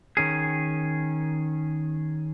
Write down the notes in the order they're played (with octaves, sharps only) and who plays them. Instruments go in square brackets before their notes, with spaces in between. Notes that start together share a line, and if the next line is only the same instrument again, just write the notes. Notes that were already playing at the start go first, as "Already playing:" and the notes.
[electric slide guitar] D#3 C#4 G#4